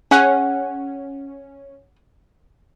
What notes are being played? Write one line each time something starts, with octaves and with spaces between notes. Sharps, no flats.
C#4 G#4 F#5